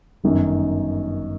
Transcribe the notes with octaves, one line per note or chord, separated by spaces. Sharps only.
G1 F#2 D#3